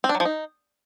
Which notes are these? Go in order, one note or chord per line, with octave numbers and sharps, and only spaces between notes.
C4
D4
F#3
F3
D#4